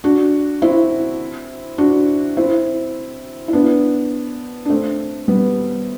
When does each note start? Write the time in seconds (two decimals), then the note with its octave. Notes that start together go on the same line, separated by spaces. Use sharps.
0.04 D4 F#4
0.62 C4 E4
1.78 D4 F#4
2.37 C4 E4
3.48 E4
3.53 B3 D4
4.65 D4
4.70 A3 C4
5.28 G3 B3